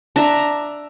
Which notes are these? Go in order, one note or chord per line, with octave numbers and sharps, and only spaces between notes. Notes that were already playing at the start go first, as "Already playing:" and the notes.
D4 E5 A#5